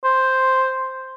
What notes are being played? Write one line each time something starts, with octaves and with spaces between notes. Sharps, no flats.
C5